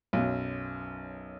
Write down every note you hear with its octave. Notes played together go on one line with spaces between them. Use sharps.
B1 F#2